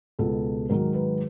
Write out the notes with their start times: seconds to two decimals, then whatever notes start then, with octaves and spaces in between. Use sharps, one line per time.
0.19 C#2 B2 G#3 B3 A4
0.69 G#2 D#3 F#3 A#4
0.94 B4